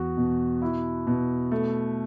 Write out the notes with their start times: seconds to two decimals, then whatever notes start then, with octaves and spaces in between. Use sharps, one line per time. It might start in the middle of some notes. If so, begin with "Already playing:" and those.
Already playing: E2 F#4
0.17 B2
0.62 E4
1.07 B2
1.52 A3